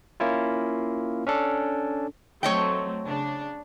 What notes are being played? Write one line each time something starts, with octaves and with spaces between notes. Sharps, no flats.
A#3 C#4 E4 F4
C#4 D4 A4
F#3 A3 C4 C#5 D#5 G5
C#3 D4